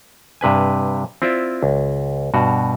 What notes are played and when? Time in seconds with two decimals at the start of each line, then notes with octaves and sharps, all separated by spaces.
0.41 G2 C3 B4 G#5
1.22 C4 E4 F4 D5 E5
1.63 C#2
2.34 G2 B2 F#4